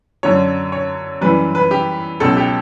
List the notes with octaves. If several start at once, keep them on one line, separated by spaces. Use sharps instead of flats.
F#2 D3 F#3 C#5
C#5
F#2 E3 G3 B4
B4
G4
C#2 B2 F#3 A4
G4